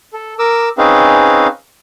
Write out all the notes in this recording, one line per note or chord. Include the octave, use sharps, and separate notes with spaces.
A4
A#4 D6 E6
C4 C#4 D#4 G#4 B4 F5